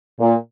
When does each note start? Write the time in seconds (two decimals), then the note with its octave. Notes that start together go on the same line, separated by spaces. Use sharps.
0.19 A#2